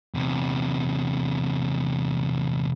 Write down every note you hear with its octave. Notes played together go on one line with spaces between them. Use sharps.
E2 C3